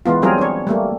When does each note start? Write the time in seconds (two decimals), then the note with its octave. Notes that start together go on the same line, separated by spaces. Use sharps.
0.06 E3 G#3 B3 F4
0.22 F#3 G3 C4 F4 G#4 A#4
0.38 D4 C#5
0.67 G3 A3 A#3